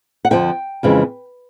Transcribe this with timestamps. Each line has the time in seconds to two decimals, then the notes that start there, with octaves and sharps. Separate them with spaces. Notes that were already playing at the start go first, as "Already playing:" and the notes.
0.25 F#5
0.31 F2 D3 F3 G5
0.83 F2 C#3 E3 G#3